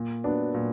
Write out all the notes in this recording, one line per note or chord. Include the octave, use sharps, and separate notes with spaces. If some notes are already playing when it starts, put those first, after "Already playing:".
Already playing: A#2
F#3 B3 D4
A#2